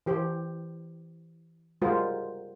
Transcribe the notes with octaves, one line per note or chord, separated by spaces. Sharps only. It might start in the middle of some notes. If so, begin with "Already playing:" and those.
E3 G4 C5
G3 G#3 F4 F#4 A#4 C5